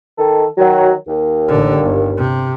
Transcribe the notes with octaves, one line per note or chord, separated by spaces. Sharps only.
D#3 A4
D#3 F#3
D#2
A1 D3
G1
C3